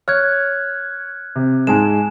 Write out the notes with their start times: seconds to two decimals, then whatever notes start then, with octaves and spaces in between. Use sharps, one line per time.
0.08 C#5 F6 F#6 G#6
1.36 C3
1.67 G#2 G#3 G#5 A5 E7